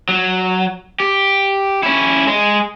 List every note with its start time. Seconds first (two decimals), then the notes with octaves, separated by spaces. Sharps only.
0.09 F#3
1.00 G4
1.83 C#4 E4
2.27 G#3